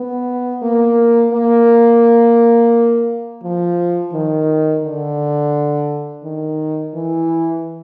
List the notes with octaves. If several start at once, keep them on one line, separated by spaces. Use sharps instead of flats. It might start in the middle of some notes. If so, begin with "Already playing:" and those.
Already playing: B3
A#3
A#3
F3
D#3
D3
D#3
E3